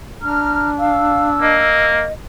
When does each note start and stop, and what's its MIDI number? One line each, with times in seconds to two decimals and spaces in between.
0.22 1.67 62
0.22 0.69 82
0.22 0.69 89
0.79 1.29 77
0.79 1.87 88
1.42 2.05 58
1.42 2.13 75